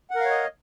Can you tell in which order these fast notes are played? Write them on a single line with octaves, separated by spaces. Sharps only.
F#5 A#4 F5 C#5 D#5